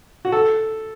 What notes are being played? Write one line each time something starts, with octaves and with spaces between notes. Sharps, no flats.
F#4
A4